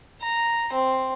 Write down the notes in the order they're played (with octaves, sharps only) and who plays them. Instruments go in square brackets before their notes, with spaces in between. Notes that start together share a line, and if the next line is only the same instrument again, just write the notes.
[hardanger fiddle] A#5
C4